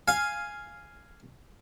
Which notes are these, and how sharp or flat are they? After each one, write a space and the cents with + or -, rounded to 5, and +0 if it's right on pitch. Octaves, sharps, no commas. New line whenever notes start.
F5 +0 G#5 +0